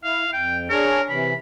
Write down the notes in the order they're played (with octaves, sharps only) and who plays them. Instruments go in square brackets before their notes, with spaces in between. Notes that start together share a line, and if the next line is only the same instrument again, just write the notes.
[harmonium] E4 [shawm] F5
[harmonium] F2 [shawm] G5
[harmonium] D4 G#4 C#5 [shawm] A#4
[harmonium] C3 E3 [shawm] B5